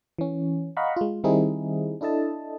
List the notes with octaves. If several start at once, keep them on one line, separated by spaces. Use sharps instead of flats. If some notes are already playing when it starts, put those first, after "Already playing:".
E3 C#4
D#5 F5 F#5 A#5 B5 C#6
G#3 F4
D#3 G3 C4 D#4 E4 G#4
D4 E4 A4 D#5 A5